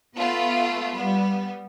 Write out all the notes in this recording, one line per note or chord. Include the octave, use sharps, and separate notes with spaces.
A3 B3 F4 B4
G3 B3